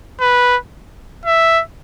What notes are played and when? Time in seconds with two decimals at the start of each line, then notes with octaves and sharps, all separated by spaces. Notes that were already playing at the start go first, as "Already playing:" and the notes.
0.21 B4
1.25 E5